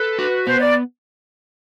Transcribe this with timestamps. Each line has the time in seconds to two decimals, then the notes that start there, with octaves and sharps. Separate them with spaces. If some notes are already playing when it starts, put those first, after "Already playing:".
Already playing: A4 B4
0.19 F#4
0.47 B3 C5
0.60 D5